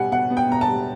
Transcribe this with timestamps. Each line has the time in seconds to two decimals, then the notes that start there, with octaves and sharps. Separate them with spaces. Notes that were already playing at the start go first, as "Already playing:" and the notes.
Already playing: B2 G3 B3 F#5 G#5
0.11 B2 F#5
0.30 B3
0.37 G5
0.49 B2 A#5
0.61 A5
0.68 G3